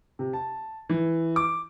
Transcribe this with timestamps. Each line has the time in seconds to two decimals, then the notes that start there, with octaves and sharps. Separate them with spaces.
0.19 C3
0.33 A5
0.89 E3
1.36 D6